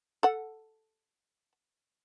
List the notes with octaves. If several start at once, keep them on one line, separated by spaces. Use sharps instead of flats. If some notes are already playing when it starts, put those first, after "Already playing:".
A4 F#5